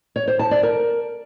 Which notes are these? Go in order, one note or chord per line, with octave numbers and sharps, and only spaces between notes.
C#5
C5
A5
D5
A#4